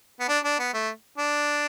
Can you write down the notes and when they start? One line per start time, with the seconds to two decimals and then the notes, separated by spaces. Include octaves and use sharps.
0.20 B3
0.28 D4
0.44 D4
0.59 B3
0.73 A3
1.18 D4